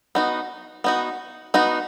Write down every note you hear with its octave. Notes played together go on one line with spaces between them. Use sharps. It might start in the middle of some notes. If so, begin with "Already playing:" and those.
B3 D#4 F#4
B3 D#4 F#4
B3 D#4 F#4